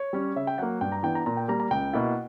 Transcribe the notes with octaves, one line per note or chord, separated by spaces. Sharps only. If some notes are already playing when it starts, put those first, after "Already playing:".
Already playing: C#5
G3 C#4
C#3 E5
G5
F#3 A#3 F#5
G2 G5
A#5
E3 B3 D4 G5
A#5
A#2 A#5
G5
G3 A#3 A#5
A#5
C#2 G5
B2 A#3 E4 F#5